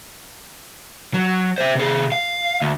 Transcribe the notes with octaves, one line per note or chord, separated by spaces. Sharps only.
F#3
C5 E5
C3 G#4
F5
D2